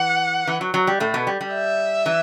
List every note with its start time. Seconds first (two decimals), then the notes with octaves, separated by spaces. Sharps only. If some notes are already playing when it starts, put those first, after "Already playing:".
Already playing: E3 F#5
0.47 E3
0.61 F#3
0.74 F#3
0.87 G3
1.00 A2 A3
1.14 B2 B3
1.27 G3
1.41 G3
1.54 E5
2.06 E3